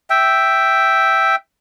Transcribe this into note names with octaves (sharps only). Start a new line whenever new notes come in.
E5 G5